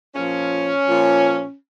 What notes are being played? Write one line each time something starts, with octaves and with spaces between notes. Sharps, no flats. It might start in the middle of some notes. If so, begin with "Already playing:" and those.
A#2 F3 C#4
A#2 F3